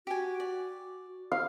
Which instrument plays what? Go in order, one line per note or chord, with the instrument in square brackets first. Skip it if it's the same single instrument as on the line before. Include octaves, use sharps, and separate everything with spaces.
[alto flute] F#4 [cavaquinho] G4 G#5
[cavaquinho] D5
[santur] F5